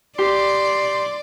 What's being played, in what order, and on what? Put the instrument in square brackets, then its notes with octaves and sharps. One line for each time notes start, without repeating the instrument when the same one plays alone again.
[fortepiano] G4 [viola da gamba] D5 [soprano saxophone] C6